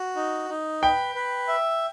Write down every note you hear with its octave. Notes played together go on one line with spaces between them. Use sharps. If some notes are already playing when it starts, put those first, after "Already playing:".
Already playing: F#4
D#4
D#4
B4 G5
B4
E5